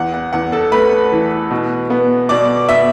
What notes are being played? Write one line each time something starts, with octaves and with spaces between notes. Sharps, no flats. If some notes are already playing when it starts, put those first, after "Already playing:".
Already playing: E2 F#5
F#5
E2 F#5
A4 A5
A3 B4 B5
E3
B2
B3
B2 D5 D6
B3 E5 E6